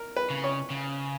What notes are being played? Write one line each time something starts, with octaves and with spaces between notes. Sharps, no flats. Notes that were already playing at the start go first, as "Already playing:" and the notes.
Already playing: A#4
B4
C#3
C#5
C#3